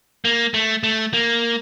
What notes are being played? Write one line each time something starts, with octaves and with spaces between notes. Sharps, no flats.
A#3
A3
A3
A#3